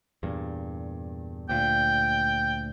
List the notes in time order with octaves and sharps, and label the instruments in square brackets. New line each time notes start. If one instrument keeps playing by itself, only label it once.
[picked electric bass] E2 G2 A#2
[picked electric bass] D2 A#2 [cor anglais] G5